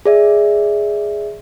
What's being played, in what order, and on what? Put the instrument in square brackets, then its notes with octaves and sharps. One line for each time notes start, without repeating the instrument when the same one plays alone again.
[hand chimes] G#4 D5 E5